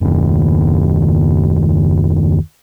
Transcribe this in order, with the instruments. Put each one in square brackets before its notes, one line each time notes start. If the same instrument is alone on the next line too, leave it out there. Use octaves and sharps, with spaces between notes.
[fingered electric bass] F#1 D#2